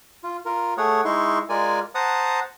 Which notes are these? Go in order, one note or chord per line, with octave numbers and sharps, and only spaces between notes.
F4
F4 A#4
A3 G#4 C#5 F#5
G#3 D#4 E4 C6 C#6
G#3 F4 A#4 D5 G#5
C5 F#5 A5 A#5 D#6